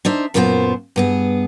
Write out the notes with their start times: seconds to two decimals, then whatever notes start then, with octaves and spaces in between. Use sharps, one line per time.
0.05 D4 D#4 C5 E5
0.34 F#2 A#2 B3 F4 G4 C5
0.96 G2 B3 G#4